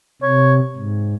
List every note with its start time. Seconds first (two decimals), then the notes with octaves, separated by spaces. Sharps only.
0.22 C3 C#5
0.77 G#2